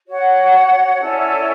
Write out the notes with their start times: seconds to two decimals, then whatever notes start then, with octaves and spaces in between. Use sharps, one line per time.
0.06 F#4 C#5 F#5
1.00 C#4 E4 A4 D5